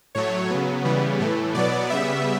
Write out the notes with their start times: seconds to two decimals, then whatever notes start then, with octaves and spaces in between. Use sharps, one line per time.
0.15 A2 F#3 A3 C#5
0.50 C#3 F#3 B3
0.85 C#3 E3 G3 B3
1.20 A2 E3 A3
1.55 B2 F#3 B3 D5
1.89 C#3 G3 B3 E5